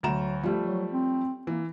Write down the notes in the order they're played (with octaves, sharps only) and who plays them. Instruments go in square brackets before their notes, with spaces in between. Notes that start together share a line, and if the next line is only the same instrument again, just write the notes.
[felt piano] D2 A#5 E7 [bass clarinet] F#3
[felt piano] F3 G3 A3
[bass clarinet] F#3
C4
[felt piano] E3 [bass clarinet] A#3